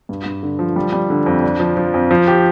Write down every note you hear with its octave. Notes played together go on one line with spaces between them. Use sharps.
G2
G2
D3
F3
G3
G3
D3
F2
D4
F3
F3
F2
F3
G4